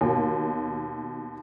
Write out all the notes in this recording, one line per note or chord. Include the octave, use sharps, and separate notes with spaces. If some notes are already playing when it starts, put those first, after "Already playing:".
D#2 B2